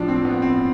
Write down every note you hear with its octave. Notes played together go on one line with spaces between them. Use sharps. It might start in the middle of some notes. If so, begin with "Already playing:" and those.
Already playing: A2 F3 D4
C4
B3
C4